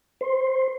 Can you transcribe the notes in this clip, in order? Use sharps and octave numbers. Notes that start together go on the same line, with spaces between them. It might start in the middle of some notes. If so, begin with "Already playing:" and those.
C5